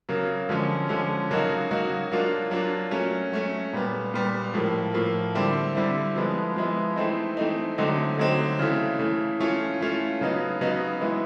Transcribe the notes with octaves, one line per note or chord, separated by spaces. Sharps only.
C#3 F#3 A#3
D3 F3 G#3 C#4
D3 F3 G#3 C#4
C#3 F#3 A#3 D#4 F#4
C#3 F#3 A#3 D#4 F#4
F#3 A#3 D4 F4
F#3 A#3 D4 F4
F#3 A3 C#4
F#3 A3 C#4
A#2 G3 B3
A#2 G3 B3
A2 F3 A#3
A2 F3 A#3
D3 G3 C4 E4
D3 G3 C4 E4
F3 G#3 B3 E4
F3 G#3 B3 E4
E3 A3 C4 D#4
E3 A3 C4 D#4
D3 F#3 A3 C4 D#4
D3 F#3 A3 C4 D#4
C#3 E3 A3
C#3 E3 A3
E3 A3 C#4 F4
E3 A3 C#4 F4
C#3 F#3 B3 D#4
C#3 F#3 B3 D#4
E3 G#3 B3 E4